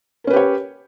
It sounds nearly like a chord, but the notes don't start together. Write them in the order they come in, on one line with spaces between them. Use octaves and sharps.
A#4 C#4 B4 G4 C#5